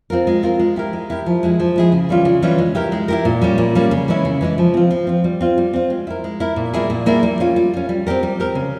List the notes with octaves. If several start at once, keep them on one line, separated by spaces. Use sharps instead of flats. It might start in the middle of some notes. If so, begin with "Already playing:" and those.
C4 F4 A#4
G#3
C4 F4 A#4
G#3
E4 G4 A#4
G#3
E4 G4 A#4
F3
G#3 E4 G#4
F3
G#3 E4 G#4
C#3
E3 G3 C#4 F4
C#3
E3 G3 C#4 F4
G#3
E4 G4 A#4
G#3
E4 G4 A#4
A#2
G3 A#3 C#4
A#2
G3 A#3 C#4
C#3
E3 G#3 C#4 E4
C#3
E3 G#3 C#4 E4
F3
C4 F4
F3
C4 F4
G3
C4 F4
G3
C4 F4
G#3
E4 A#4
G#3
E4 A#4
A#2
G3 A#3 E4 G#4
A#2
G3 A#3 E4 G#4
G3
C#4 F4
G3
C#4 F4
G3
C4 G4 A#4
G3
C4 G4 A#4
C#3